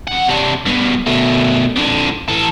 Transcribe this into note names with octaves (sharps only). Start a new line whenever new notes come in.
F2 F#5
C3 D4
G2 B2
B2 A3
F2 D3
E3 A4